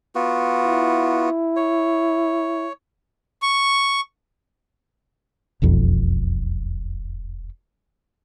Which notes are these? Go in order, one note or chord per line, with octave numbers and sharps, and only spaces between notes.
B3 F4 F#4
E4
C#5
C#6
E1 B1 F2